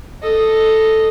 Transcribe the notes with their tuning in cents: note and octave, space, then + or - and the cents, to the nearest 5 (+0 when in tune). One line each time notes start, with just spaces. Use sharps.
A4 +0 D#5 +0